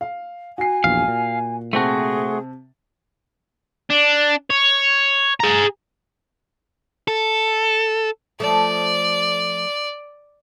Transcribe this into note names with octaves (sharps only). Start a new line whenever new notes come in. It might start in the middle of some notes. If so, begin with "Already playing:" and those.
F5
F#4 G#5 C7
A#1 E2 F5
A#2
C3 A3 C4 F#4 G#4 A5
D4
C#5
G#4 A#5
A4
F3 A3 A4 D5